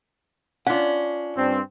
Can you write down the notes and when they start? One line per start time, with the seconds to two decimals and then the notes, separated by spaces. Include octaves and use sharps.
0.67 C#4 D4 F4 F#5
1.36 G2 C4